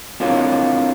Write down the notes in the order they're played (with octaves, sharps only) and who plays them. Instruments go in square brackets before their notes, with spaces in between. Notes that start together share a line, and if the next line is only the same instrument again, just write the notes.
[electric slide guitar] C4 D4 E4 F4 A#4 C#5